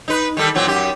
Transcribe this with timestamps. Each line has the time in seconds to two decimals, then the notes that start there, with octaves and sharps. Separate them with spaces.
0.08 D#4 B4
0.37 D#3 G3 A4
0.55 A#2 F#3 C4
0.66 F#2 G4